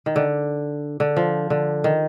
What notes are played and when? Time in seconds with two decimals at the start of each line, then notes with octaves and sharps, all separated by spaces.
0.06 D#3
0.16 D3
1.00 D3
1.17 F3
1.50 D3
1.84 D#3